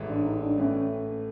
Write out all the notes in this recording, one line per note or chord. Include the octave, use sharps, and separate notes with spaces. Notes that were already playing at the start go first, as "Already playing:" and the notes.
Already playing: A1 G#2 E3 A3
D4
D#4
D4
A2 E3 A3 C#4